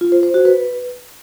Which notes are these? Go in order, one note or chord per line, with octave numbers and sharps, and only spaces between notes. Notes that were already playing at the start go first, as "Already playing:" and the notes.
F4
C5
C5
F#4
B4